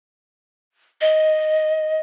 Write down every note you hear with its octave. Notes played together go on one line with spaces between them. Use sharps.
D#5